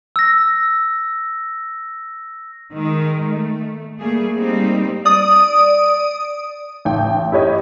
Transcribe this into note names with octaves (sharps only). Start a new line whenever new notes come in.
E6 A#6
D#3 G#3
A3
G3 A3 A#3 G#4
G3 A#3 C4 D#4
D5 D#6
A1 G5
E4 G4 C#5 D#5